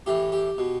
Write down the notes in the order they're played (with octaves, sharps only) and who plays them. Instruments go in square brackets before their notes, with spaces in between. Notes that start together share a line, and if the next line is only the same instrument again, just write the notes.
[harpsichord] A2 E3 G4
G4
B2